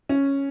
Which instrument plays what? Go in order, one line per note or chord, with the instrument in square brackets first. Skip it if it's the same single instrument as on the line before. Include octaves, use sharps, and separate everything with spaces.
[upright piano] C#4